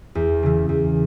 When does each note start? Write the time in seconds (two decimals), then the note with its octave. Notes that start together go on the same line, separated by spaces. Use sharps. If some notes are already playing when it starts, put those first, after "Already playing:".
0.15 E2
0.43 C#3 E3
0.69 E2